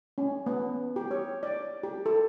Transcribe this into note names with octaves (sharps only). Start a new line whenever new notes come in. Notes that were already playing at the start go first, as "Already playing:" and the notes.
C#4
B3
G4
C#5
D5
G4
A4